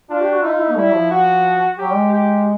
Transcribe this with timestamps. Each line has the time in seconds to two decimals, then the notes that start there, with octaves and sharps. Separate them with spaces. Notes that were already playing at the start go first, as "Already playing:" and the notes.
0.10 D4 F4
0.21 G4
0.32 F#4
0.43 D#4 E4
0.52 F4
0.61 E4
0.69 A#3
0.77 G3 E4
0.94 F3
1.11 F#4
1.78 F#3 G4
1.95 G#3
2.12 G4